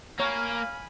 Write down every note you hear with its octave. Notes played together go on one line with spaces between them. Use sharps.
A#3 C#5 F5 G#5 A#5 B5